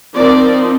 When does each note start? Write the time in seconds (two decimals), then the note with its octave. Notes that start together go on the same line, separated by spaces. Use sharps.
0.15 F3 C4 D#4 A#4 D5